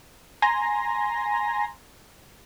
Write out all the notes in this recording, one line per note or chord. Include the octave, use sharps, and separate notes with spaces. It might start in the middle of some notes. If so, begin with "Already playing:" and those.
G#5 A#5 C6 A#6